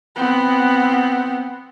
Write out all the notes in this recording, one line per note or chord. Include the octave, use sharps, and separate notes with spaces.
B3 C4